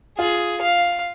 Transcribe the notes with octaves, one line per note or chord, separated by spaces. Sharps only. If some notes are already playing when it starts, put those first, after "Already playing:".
F4 G#4
F5